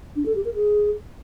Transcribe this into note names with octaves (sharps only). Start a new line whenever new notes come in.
D4
A4
G4
A#4
G#4